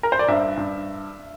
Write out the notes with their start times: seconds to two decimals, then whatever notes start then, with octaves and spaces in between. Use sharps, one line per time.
0.03 A#4
0.12 C5
0.19 D5
0.28 G2 E5
0.57 G2